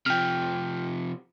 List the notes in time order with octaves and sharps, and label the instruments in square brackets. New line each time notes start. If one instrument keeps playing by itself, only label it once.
[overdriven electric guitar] C3 F3 [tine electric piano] G5 F6